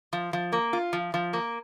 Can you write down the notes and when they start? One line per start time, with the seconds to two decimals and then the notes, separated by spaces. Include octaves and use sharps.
0.13 F3
0.33 F3
0.52 A#3
0.73 F4
0.93 F3
1.14 F3
1.33 A#3